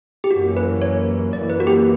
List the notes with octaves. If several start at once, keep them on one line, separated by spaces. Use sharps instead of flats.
G4
F#2 E3 A#3 C#4 F#4
B4
C#5
F#2 E3 A#3 D5
B4
F#4
G4